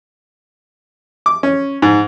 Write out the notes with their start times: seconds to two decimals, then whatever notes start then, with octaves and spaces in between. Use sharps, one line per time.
1.26 D6
1.43 C#4
1.82 G#2